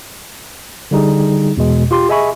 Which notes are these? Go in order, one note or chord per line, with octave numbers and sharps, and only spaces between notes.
D3 G3 D#4 G#4
E2 B2 G#3
F4 G4 C6
G#4 D#5 E5 G#5 B5 C#6